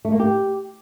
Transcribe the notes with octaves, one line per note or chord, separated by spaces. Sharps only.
A3
A#3
G4